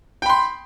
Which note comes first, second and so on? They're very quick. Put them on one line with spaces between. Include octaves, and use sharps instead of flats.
G5 B5 C6